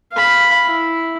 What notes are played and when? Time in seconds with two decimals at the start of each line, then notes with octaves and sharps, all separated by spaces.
0.13 F5 B5
0.65 E4